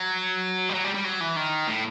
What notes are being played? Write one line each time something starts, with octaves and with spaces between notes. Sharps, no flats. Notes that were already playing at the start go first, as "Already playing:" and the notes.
Already playing: F#3
G3
F#3
G3
G3
F#3
E3
D#3
A2